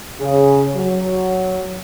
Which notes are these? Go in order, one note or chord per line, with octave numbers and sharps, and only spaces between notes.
C#3
F#3